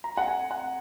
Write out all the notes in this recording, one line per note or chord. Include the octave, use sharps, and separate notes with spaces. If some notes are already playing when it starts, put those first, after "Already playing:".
A#5
F#5
G#5
F#5